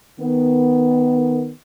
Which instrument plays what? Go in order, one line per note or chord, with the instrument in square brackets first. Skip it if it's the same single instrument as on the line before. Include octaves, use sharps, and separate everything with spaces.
[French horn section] D#3 B3